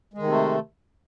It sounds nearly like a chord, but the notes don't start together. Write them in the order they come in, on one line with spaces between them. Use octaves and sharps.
G#3 D#3 C3 A3